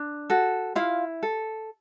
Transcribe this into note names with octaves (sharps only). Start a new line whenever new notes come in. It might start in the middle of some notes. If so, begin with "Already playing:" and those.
Already playing: D4
F#4 A4
E4 F4 F5
A4